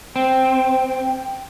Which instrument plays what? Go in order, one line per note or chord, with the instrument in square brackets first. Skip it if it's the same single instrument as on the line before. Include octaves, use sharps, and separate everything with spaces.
[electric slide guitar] C4 [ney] G5